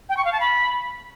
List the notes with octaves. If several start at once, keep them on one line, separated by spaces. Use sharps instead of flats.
G5
C#6
F5
A5
B5